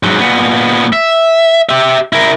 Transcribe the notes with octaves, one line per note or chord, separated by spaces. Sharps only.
G#2 F#3
A#2 B3
E5
G4 E5
E4 A#4